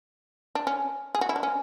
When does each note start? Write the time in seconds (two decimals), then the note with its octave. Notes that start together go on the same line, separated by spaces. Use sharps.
0.55 D4
0.67 C#4
1.15 G#4
1.21 F#4
1.29 E4
1.36 D4
1.43 C#4